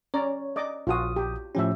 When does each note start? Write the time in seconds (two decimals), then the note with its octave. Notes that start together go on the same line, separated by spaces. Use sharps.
0.14 C#4 C#5 D5 A#5
0.56 D5 D#5 D6
0.87 A#1 F4 F#4 D#6
1.16 G4
1.55 A2 F3 C#4 G4 E5